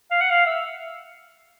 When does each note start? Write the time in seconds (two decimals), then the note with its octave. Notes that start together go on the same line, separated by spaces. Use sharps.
0.11 F5
0.21 F#5
0.30 F5
0.46 E5